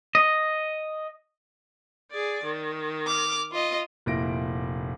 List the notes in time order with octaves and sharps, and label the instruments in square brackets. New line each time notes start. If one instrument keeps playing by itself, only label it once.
[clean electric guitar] D#5
[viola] G#4 D5
D#3
[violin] D6 F6
F4 D#5
[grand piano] F1 A#2 E4 A#6 D7